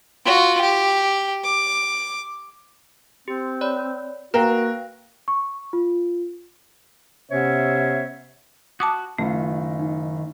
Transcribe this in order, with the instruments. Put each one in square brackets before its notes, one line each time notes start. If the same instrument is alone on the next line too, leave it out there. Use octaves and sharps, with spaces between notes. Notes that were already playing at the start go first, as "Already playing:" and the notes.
[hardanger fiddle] F4 F#4
G4
D6
[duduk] C4 [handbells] G4
[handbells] C#5 D5 B5
[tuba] A#3 [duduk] F#4 [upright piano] A#4 [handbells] B4 F5 G5
[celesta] C#6
F4
[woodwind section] C3 B3 C#4 C5 C#5 E5
[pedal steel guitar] F#4 [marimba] A5 D6 D#6
[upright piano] F#1 F4 [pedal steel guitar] D#3 [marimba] A3
[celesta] D#4